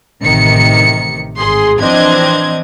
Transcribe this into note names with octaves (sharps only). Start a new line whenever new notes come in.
A1 C3 D#3 C#7
G#1 G#4 C6
E3 F3 C4 D4 D#5 G#6